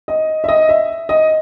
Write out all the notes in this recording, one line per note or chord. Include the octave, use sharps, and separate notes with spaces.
D#5
E5
D#5
E5
D#5